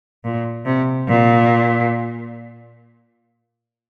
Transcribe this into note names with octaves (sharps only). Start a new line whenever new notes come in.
A#2
C3
A#2